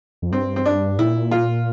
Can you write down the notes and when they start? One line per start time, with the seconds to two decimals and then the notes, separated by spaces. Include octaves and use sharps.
0.22 F2
0.31 G2 C4
0.56 C4
0.66 D4
0.98 A#2 E4
1.31 F4